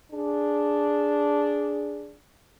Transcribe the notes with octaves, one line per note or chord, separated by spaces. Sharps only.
D4 G#4